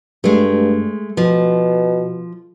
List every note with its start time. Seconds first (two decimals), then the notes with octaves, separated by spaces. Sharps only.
0.24 G2 G#3 A3
1.17 B2 F3